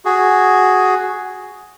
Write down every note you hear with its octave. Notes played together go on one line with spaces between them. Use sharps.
F#4 G#4